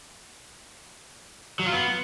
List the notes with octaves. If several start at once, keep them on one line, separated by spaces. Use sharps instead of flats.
F#3
F4
B3